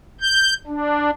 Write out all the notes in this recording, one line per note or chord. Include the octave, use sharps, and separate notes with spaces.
G6
D4